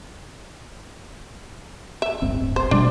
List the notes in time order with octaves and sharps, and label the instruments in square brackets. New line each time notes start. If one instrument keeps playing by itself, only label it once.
[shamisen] E5
[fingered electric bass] D1 G1 C4
[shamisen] C5
[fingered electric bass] B2 G3 A3 [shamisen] D4